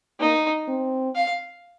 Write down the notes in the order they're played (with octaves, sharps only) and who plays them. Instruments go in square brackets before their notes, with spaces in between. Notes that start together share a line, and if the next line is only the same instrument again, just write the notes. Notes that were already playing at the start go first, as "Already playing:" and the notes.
[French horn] A#3 [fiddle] D#4
[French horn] C4
[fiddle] F5